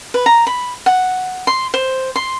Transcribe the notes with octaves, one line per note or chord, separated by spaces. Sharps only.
B4
A#5
B5
F#5
C6
C5
C6